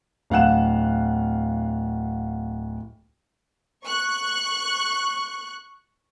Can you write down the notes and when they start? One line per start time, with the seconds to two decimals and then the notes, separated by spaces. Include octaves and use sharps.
0.30 D1 F5 F#5 F#6 E7
3.85 C#6 F#6